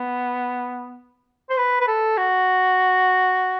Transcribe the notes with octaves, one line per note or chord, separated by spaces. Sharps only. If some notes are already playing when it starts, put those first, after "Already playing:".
Already playing: B3
C5
B4
B4
A4
F#4